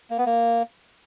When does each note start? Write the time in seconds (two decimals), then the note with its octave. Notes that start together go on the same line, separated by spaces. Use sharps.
0.10 A#3
0.18 B3
0.26 A#3